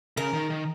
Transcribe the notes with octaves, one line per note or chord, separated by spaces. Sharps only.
C#3 A#4
D#3
D#3